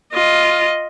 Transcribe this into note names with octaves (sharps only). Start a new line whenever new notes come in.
F4 D#5